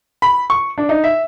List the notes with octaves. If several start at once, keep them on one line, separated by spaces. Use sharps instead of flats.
B5
C#6
D4
D#4
E5